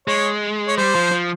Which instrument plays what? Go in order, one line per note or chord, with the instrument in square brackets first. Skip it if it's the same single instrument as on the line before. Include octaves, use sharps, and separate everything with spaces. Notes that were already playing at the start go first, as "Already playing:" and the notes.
[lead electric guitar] G#3 [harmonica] C#5
[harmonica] C#5
[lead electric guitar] G3 [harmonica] C5
[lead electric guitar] F3
F3